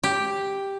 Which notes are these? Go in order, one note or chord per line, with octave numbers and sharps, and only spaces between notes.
G4